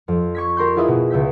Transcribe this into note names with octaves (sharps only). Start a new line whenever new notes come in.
F2
C#6 G#6 B6
G4 A#4 C6 G6
E4 F4 G#4 B4 D#5 E5
B2
C#2 E5 G6 B6